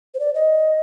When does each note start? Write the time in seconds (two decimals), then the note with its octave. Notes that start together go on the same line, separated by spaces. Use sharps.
0.14 C5
0.20 D5
0.35 D#5